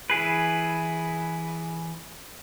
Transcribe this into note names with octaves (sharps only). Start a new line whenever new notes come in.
E3 E4 G#4 B4